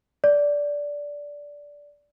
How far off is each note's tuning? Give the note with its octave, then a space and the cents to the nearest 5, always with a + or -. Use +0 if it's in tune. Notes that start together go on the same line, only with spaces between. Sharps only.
D5 -15